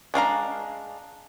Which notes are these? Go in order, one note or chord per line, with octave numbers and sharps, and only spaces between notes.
G#3 D4 F5 A#5